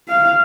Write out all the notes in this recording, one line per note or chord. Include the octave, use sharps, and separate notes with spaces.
F5